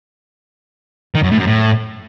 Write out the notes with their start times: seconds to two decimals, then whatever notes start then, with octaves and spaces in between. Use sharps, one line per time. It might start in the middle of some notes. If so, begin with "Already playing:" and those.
1.15 D#3
1.23 F#2
1.31 A2
1.38 F#2
1.46 A2